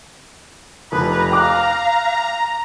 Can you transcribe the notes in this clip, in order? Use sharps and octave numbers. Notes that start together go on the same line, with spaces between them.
F1 B4 A#5
F5 G5 D6 F#6